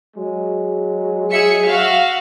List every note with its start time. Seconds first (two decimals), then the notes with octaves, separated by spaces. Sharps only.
0.16 F#3 G#3
1.30 G#4 E5 C#7
1.67 F#4 E5 F5